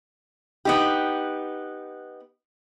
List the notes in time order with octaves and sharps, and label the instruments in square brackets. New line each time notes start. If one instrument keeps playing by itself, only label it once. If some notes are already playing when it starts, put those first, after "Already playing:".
[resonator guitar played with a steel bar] B3 D#4 G4